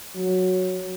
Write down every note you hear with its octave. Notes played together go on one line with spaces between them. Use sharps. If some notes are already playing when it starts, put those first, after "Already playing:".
F#3